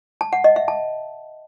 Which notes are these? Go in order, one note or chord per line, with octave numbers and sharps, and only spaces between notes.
A5
F#5
D#5
E5
A5